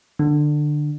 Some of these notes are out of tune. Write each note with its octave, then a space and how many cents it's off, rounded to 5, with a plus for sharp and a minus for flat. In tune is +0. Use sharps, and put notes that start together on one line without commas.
D3 +20